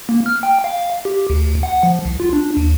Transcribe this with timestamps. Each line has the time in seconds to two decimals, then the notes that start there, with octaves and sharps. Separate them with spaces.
0.09 A#3
0.26 F6
0.43 G5
0.64 F5
1.05 G4
1.30 D2
1.63 F#5
1.83 F3
2.05 C2
2.20 F4
2.33 D4
2.57 D#2